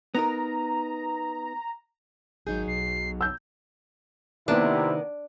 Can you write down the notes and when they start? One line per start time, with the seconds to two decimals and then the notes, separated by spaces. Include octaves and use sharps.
0.15 B3 D#4 A#4 A#5
2.47 G#1 F#3 D#4 G#4 G6
2.67 B1 C7
3.21 E6 G6
4.48 C3 D#3 A#3 B3 D4 E4